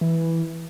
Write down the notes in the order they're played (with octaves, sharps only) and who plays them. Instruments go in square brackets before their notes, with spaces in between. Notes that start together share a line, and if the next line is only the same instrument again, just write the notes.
[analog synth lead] E3